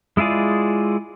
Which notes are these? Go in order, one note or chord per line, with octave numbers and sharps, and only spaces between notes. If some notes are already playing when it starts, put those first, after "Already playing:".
G#3 E4 F4 G#4 D5